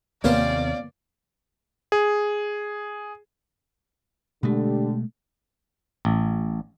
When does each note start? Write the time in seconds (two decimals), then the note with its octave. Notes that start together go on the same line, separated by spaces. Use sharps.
0.24 D#2 C3 A#3 B3 C#4 F4 C5 D5
1.92 G#4
4.43 B2 D3 G#3 A3 G4
6.05 A1